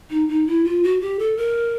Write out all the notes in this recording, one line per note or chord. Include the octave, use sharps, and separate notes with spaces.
D#4
D#4
E4
F4
F#4
G4
A4
A#4